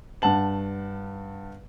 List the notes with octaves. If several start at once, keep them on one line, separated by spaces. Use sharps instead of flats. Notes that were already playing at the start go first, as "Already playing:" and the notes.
G2 F#5 A5 F#7